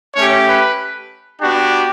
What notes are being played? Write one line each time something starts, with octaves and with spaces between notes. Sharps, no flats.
A3 C#4 G4 C#5
B4
B3 D4 F#4 G4